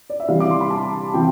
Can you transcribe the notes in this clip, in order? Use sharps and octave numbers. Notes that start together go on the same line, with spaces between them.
D5
E5
C3 E3 G3 F5
D6
C6
B5
A5
C3 E3 G5